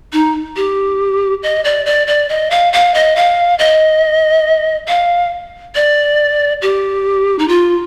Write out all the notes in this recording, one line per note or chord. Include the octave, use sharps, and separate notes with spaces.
D#4
G4
D#5
D5
D5
D5
D#5
F5
F5
D#5
F5
D#5
F5
D5
G4
D#4
F4